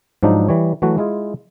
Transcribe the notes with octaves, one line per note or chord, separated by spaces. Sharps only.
G#2 F3 F#3 D4 D#4
E3 G3 C#5
E3 F#3 A3 F#4
G#3 E4 F4 G#4